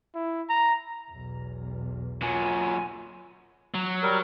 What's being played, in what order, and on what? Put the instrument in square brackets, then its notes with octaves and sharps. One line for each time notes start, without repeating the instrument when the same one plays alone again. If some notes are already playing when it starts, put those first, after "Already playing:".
[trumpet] E4
A#5
[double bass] B1 E2
[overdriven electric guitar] A#2 F#3 [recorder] G#5
[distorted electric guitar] F#3
[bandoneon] G3 A#4